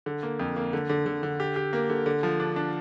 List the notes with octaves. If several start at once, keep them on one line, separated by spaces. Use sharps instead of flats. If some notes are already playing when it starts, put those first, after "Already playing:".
D3
A#3
F2
A#3
D3
D3
D3
D3
G4
G4
A#3
D3
D3
F3
D4
D4